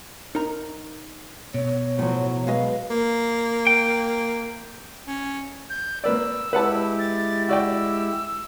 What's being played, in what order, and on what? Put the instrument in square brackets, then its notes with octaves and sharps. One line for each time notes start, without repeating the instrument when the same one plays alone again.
[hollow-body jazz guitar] D#4 A#4 A#5
[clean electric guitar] B2 [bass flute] C#5
[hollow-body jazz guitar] A2 F3 [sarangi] F#3
[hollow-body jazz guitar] F#3 G#3 D#5 [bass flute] B4 [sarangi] F5
[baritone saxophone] A#3
[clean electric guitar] G5
[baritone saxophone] C#4
[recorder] G6
[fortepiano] A#3 B4 D5 [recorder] E6
[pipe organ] G#3 E4 G4 [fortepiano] B4 F#5 A5
[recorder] A6
[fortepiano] F#4 D5 G5 [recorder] E6